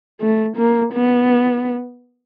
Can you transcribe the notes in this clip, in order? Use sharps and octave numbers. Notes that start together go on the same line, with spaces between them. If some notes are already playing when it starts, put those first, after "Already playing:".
A3
A#3
B3